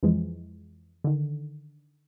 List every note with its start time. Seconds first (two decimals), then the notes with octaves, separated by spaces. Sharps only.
0.03 F2 E3 F3 G#3
1.04 D3 D#3